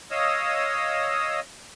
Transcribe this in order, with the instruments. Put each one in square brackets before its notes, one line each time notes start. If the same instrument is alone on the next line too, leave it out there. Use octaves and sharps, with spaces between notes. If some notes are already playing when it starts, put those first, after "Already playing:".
[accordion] C#5 D#5 F5 D#6 E6